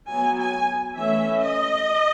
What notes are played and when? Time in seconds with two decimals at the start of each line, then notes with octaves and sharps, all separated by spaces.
0.08 F#3 B3 G#5
0.37 G#5
0.96 E3 A3 C#4 E5
1.40 D#5